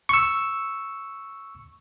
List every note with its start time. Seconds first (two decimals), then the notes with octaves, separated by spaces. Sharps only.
0.09 C#6 E6